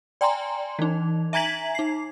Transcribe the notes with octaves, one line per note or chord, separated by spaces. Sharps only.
D5 G5 G#5 A#5 C6
E3 D#4
E5 G#5 A#5 G#6 B6 F#7
D#4 C7